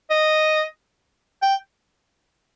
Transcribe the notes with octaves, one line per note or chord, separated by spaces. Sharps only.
D#5
G5